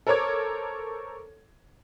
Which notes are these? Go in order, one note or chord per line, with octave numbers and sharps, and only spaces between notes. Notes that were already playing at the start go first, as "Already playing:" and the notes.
A4 A#4 C5 C#5 D6 G#6